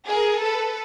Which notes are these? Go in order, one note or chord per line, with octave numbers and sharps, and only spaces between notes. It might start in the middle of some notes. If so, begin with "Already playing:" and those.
G#4 A#4
A4 B4